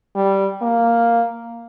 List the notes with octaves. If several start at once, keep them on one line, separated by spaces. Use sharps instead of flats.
G3
A#3